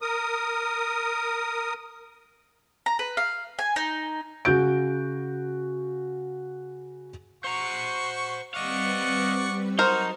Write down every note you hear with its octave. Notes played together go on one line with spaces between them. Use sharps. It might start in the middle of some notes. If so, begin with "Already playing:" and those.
A#4 D#6
A#5
B4
F5
G#5
D#4
C#3 F#4 G6 D7
F#4 C5 A#5 C#6
G3 C4 B4 D5 D#5 F5 F#5 C#6
F#3 D#4 F#4 A#4 C5 A5 C7